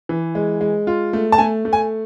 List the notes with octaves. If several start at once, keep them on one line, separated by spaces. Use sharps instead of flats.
E3
G#3
G#3
F4
A3
A5
A3 G#5
A3
G#5